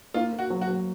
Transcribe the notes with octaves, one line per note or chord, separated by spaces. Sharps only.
A#3 F4
A#3
F#4
F#3
F#4
F#3